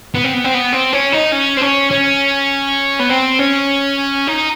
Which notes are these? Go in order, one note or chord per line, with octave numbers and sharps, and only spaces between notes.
B3
C4
B3
C4
B3
C4
C#4
D#4
C#4
C4
C#4
C#4
B3
C4
C#4
D#4